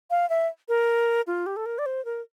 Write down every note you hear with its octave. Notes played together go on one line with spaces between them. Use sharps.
F5
E5
A#4
F4
G4
A4
A#4
D5
C5
A#4